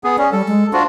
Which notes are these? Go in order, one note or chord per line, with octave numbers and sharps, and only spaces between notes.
B3 G#4
C#4 D5
G3 A4
G#3
D4 F4 F#4 C5